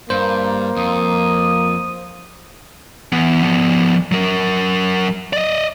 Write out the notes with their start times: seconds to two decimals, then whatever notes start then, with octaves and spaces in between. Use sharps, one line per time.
0.10 G2 A#3 C5
0.77 F2 D#6
3.12 E3 B3
3.43 F3 B3
4.12 F#3 A#4
5.33 D5 D#5